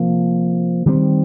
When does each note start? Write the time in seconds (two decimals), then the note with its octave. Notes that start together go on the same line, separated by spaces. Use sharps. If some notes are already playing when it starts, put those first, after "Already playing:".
Already playing: C3 F3 A#3
0.86 D#3 G3 C4